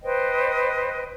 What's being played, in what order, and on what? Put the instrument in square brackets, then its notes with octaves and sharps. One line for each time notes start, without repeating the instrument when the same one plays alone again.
[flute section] B4 C5 D#5 G5